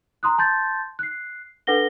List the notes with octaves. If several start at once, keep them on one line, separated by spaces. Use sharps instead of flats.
A#5 C6 D#6 F#6
A5 C6 G6 A6
F#6 C7
D4 A4 B4 F#5 A#6 G7